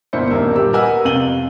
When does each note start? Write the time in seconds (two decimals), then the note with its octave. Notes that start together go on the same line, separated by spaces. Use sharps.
0.13 G1 B2 A#3 E4 C5 C#7
0.30 D#1 A#1 D#3 A#3 E6
0.55 D#1 G3 G4 E6
0.73 A#4 B4 D#5 F#5 G#5 E6
1.05 F2 C3 F5 D#7 F#7 G7